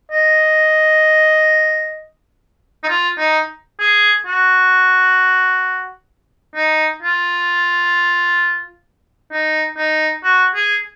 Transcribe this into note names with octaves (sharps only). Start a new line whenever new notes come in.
D#5
D#4
F4
D#4
G#4
F#4
D#4
F4
D#4
D#4
F#4
G#4